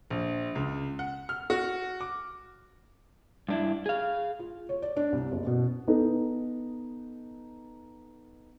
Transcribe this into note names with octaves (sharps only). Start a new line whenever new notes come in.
A#1
C#2
F#5
F6
F#4
D6
G2 D4 E4
G#4 F5
F4
C#5
D5
D4
C2
F#1
B2
B3 D#4 A4